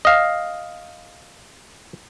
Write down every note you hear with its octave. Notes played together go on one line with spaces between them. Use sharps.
D#5 F5